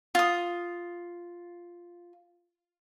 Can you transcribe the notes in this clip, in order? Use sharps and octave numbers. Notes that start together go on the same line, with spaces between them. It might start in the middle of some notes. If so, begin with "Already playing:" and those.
F4 D#6